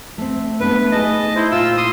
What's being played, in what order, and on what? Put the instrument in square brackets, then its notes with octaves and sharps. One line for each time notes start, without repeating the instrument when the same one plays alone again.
[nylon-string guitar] A3 C4
[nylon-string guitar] A3 B3 D4 [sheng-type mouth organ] B4
[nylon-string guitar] D#4 G#4 [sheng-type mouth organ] D#5 A5
[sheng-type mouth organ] E4 C5
[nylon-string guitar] A#2 [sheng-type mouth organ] F4 E6
[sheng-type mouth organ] C6 D#6